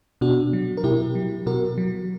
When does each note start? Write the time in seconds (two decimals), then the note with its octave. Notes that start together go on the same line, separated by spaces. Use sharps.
0.21 B2 D4 F#4
0.53 F#3
0.77 A#4
0.84 B2 E4 G4
1.15 F#3
1.46 B2 F#4 A#4
1.78 F#3